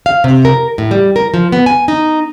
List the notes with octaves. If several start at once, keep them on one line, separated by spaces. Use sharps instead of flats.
F5
C3
A#4
A2
G3
A#4
F3
B3
G#5
D#4